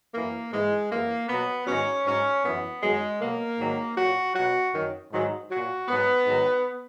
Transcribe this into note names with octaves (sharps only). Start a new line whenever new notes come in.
F#2 E3 A#3
G#2 E3 G#3
F#2 E3 A#3
B2 F#3 B3
G#2 D#3 F#3 C#4
G#2 F#3 C#4
F#2 E3 B3
F#2 D#3 F#3 G#3
B2 F#3 A#3
G#2 D#3 F#3
A#2 F#3 F#4
B2 F#3 F#4
F#2 D#3 F#3
G#2 D#3 F#3
A#2 F#3 F#4
G#2 F#3 B3
G#2 D#3 F#3